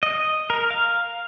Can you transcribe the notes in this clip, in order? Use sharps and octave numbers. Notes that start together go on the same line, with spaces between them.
D#5
A#4
F5